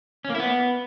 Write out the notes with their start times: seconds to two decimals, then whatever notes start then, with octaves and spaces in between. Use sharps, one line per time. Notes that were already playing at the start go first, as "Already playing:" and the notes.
0.25 C#4
0.30 A#3
0.35 E4
0.40 B3